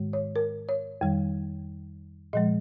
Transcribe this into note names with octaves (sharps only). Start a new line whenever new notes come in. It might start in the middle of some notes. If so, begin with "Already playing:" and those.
Already playing: G#2 D#3 G#3
C#5
A#4
C#5
F2 D#3 G3
A#2 F3 G#3 D#5